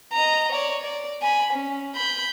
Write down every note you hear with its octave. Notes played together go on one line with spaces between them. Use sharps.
D#5 A#5
C#5 D5
D5
G#5 B5
C#4
B5 G6